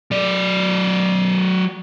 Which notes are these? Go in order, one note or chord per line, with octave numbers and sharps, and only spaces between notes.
F#3 D5